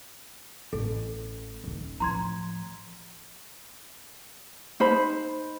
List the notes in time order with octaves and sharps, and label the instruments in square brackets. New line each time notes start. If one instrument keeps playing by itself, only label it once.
[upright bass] A1 [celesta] A4
[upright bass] D#1 D#3
[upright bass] A2 F3 [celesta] A#5 C6 G#6
[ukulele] D#4 C5 B5